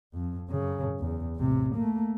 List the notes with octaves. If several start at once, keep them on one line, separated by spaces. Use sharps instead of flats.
F2
F#2 C#3
E2
A1 C3
A3 A#3